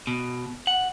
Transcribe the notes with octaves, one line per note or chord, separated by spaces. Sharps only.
B2
F#5